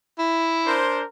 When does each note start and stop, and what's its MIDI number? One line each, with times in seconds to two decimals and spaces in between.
0.18 0.78 64
0.66 1.03 62
0.66 1.03 70
0.66 1.03 72